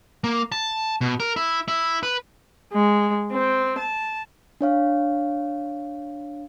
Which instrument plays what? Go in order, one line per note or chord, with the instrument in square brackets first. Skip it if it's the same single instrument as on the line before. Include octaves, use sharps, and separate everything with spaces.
[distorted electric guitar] A#3
A5
B2
A#4
E4
E4
B4
[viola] G#3
C4
A5
[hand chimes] D4 C#5 F5